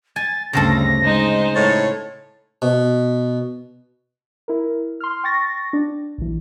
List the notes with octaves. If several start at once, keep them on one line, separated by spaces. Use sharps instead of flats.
G#5 A6
D2 G2 C#3 C4 A4 A#6
G#3 D#4 C5
A2 C#5 A6
B2
E4 A#4
C6 F6
G5 C#6 A6 A#6
D4
A#1 E3